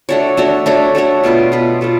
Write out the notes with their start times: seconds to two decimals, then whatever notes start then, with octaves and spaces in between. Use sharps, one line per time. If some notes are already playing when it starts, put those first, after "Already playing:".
0.09 A3 D4 F#4 C#5
0.37 A3 D4 F#4 C#5
0.66 A3 D4 F#4 C#5
0.95 A3 D4 F#4 C#5
1.24 B2 A3 F4 B4
1.52 B2 A3 F4 B4
1.81 B2 A3 F4